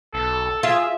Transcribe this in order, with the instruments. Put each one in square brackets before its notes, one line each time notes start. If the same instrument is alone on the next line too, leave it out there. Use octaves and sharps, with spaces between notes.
[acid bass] B1 [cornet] A4
[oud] F4 [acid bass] G#4 [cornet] E5